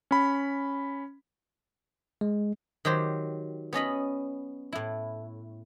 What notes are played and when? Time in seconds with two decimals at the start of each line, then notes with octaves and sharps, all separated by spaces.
0.11 C#4 B5
2.21 G#3
2.85 D#3 F#3 G4 C5
3.73 B3 C#4 D#5 B5
4.73 A2 E4